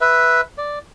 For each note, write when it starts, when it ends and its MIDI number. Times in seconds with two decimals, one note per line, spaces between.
0.01 0.41 71
0.01 0.41 76
0.58 0.79 74